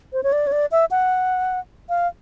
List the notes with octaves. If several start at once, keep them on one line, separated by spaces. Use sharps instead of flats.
C5
C#5
D5
C#5
D5
E5
F#5
F5